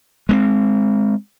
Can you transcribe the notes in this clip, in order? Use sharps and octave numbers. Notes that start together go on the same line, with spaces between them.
G#3 A3 C4